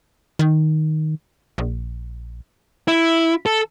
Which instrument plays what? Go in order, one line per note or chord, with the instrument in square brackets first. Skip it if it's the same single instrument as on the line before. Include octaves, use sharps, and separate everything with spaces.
[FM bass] D#3
A#1
[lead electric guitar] E4
A4